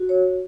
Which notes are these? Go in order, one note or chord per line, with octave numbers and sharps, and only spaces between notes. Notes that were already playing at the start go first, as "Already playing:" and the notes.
Already playing: F#4
C#5